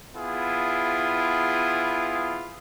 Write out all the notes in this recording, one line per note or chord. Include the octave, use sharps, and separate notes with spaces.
B3 E4 F4 G#4